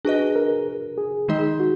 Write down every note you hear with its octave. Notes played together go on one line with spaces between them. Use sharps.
D4 F#4 G#4 B4 D#5
A#4
G#4
D#3 G#3 D#4 G#4 D#5
F#4